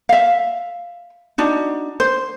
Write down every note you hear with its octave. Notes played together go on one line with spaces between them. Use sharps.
E5 F5
D4 D#4 F#4
C5